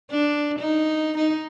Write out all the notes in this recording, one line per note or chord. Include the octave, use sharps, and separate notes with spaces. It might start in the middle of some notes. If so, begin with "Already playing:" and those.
D4
D#4
D#4